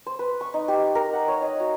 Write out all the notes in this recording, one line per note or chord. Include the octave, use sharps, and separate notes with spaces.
C5
B4
C#6
D#4
G4
A#4
F#5
C#5
D#5
F#4